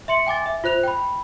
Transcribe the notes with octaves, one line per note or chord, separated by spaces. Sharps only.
E5 C6 C#7 F#7
G5 G#5 D6 A6
E5
F4 C5 F#6 F7
G5 B5